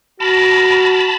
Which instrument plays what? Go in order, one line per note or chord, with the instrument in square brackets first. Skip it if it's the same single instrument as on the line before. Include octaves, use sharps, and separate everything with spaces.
[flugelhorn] F#4 [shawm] A#4 [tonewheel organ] A5 B5